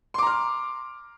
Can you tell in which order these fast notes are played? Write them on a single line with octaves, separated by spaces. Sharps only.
C6 D6 A#5 F6